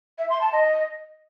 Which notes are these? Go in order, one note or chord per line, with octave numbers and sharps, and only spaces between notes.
E5
C6
A5
D#5